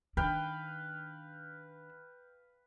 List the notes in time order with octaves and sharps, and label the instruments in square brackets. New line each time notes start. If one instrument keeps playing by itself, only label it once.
[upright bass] D#3 D4 [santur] B4 F5 G5